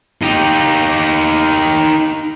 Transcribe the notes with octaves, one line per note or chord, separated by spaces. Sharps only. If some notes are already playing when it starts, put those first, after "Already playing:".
D#4 G4